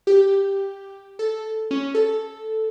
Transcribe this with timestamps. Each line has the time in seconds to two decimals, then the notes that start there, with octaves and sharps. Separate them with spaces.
0.07 G4
1.19 A4
1.71 C#4
1.95 A4